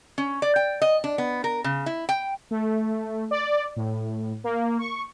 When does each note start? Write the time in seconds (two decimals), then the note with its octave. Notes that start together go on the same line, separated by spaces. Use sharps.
0.18 C#4
0.42 D5
0.56 G5
0.82 D#5
1.04 D4
1.18 B3
1.44 A#4
1.64 C#3
1.86 E4
2.09 G5
2.51 A3
3.31 D5
3.76 A2
4.44 A#3
4.79 C#6